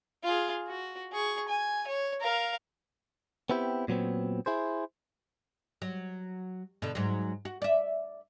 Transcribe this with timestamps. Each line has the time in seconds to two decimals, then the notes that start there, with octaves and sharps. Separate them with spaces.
0.23 F4 G#4
0.68 F#4
1.12 G#4 C#6
1.48 G#5
1.87 C#5
2.20 A#4 F5
3.50 B3 C4 E4 G4
3.88 A#2 F#3 B3 C4
4.46 E4 G#4 C5
5.82 F#3
6.82 B2 D3
6.95 G#2 F#3
7.45 F#4
7.62 D5 E5